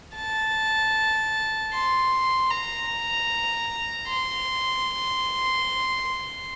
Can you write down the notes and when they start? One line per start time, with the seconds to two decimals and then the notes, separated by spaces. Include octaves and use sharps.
0.16 A5
1.73 C6
2.50 A#5
4.07 C6